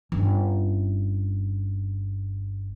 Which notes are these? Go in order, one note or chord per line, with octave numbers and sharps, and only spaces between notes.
G1 C#4